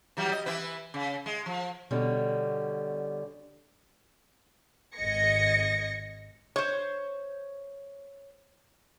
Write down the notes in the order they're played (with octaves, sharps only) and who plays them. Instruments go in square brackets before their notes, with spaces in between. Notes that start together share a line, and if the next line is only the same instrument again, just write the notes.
[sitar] E3 F#3 G3
D#5
E3 E4 B4
C#3
G#3
F3
[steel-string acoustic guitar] B2 D3 G3 C#4
[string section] G#1 D#5 G#6 A#6 C#7
[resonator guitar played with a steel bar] C5 C#5